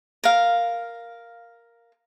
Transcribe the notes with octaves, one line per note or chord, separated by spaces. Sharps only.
A#4 F5